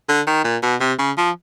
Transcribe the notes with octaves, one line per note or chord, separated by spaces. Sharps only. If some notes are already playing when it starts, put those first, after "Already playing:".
D3
D#3
A#2
B2
C3
C#3
F3